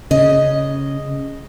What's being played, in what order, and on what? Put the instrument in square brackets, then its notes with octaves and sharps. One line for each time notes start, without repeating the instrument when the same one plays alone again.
[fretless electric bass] C#3 [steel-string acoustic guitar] D#5